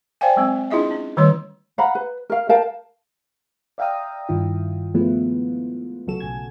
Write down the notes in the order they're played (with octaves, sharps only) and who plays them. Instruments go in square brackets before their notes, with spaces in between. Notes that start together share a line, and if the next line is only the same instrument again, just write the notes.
[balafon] C5 D5 F5 G5 G#5
F#3 G#3 C4
D4 E4 F4 G#4 D#5 E5
C#4
D#3 G3 A3 C#5 C6
[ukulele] F5 F#5 A#5 B5
B4
A#4 F5
A#4 F5 G5 A5
[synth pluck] D5 E5 F5 G5 A#5 D#6
G2 D#3 E4 F4
F3 G#3 A3 B3 E4 F4
C2 C#3 F#3 F#4 A4 E7
B1 G#5 G#6